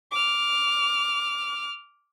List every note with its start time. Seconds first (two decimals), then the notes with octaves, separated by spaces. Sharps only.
0.11 D6 F6